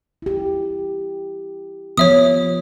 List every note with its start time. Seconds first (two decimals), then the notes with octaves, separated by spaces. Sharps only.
0.22 E4 G4
1.97 F3 B3 C#5 E5 D#6